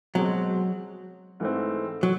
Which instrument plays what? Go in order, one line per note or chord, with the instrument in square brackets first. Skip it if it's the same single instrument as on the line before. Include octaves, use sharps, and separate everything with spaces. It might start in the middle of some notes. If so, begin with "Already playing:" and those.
[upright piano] B2 G#3 C4 [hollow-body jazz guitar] F#3
[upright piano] G#2 E3 A3 C4
[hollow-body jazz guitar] F#3